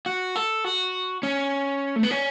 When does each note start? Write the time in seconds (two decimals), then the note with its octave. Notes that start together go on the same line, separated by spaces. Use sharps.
0.06 F#4
0.36 A4
0.65 F#4
1.23 C#4
1.96 A3
2.03 B3
2.11 C#4